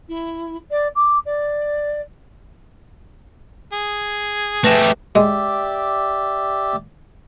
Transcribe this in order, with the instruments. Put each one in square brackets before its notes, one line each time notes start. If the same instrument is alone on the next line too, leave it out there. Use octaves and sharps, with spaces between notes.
[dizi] E4
D5
D6
D5
[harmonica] G#4
[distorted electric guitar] A3 G4 [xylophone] B4 A#6 E7
[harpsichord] G#3 [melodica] G4 D5 E5